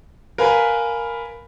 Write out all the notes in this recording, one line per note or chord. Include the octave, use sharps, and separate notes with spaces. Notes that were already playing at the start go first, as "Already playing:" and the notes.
A#4 B4 F5 G#5 B5